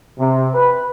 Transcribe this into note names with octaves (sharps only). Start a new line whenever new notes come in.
C3
B4